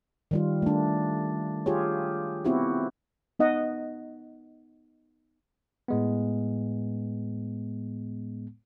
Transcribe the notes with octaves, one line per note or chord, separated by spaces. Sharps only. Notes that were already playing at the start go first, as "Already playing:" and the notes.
D#3 G3 F4
A3 D4
F4 G4 G#4 C#5
B3 C4 E4 F#4 G4
B3 D#4 D#5 F#5
A2 G#3 B3